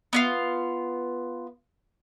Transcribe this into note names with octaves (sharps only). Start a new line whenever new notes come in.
B3 E4 F4